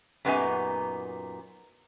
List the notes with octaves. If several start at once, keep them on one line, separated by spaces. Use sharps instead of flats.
F#2 A#2 B3 D#4 G4 G#5